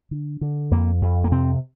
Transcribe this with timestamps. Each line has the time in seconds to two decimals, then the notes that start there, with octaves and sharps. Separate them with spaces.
0.11 D3
0.41 D3
0.71 F2 A#3
1.02 F2
1.24 A#3
1.32 C3 C4